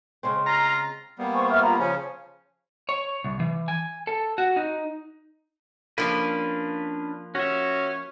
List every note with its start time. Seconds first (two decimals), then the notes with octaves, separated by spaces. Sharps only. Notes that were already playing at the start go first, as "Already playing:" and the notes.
0.23 C#3 G#3 C4
0.46 F4 A#5
1.19 G3 A#3 B3
1.34 C5 G#5 C#6
1.49 E5 F6
1.60 F4 A#5 B5
1.79 C#3 F3 C#4 G#5
2.89 C#5
3.24 C2
3.40 E3
3.68 G#5
4.07 A4
4.38 F#4
4.56 D#4
5.98 F3 A#3 C#4 D4 B4
7.35 C#4 F#4 E5